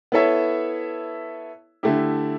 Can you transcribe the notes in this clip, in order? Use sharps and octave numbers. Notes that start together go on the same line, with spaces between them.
B3 E4 A4 C#5 E5
D3 A3 E4 G4